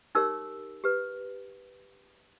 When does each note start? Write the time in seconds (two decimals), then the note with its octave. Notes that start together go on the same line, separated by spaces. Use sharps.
0.15 D#4 G4 A#4 C#5 E6
0.84 G4 B4